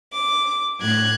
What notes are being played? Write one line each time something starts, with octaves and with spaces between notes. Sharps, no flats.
D6
A2 F#6 G#6